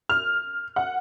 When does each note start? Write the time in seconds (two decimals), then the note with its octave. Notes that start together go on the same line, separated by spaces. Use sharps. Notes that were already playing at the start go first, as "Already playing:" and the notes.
0.09 F6
0.76 F#5